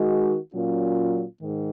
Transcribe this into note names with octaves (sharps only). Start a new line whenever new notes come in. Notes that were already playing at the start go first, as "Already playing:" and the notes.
Already playing: D#3 G#3 D#4 F#4
A#2 F#3 C#4 F4
G#2 D#3